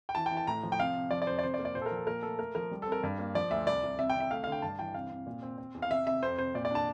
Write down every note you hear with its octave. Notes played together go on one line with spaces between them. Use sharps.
G5
E3 A5
G5
E3
A5
A2 A#5
F3
G5
C3 F5
C3
F3 D5
D5
F2 C5
D5
C3 C5
D5
A#3
D5
A#2 C5
A4
A#4
F3
A4
A#2 A#4
A3 A4
A3 A#4
F3 A#4
G3
C4 A4
A#4
G2
A#3
F3 D5
D2 E5
C2 D5
C2
C3 E5
G5
C3
E5
A3 F5
F5
D3
G5
G2 A5
E3 G5
C3 F5
C3
A#2
C4
C4
E2
F5
C3 E5
C3 E5
F2 C5
C3 C5
A#2 D5
D5
D4 A5